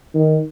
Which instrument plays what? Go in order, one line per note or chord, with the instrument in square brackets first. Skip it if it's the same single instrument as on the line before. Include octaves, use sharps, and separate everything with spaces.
[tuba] D#3